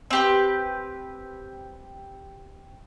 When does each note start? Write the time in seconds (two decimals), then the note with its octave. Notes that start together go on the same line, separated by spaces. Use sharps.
0.11 C4 G4 B4